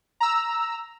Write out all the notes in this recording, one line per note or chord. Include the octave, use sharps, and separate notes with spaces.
A#5 E6